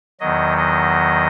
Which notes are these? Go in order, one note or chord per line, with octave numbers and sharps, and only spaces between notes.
E2 D#3 F#3 D#5
D#5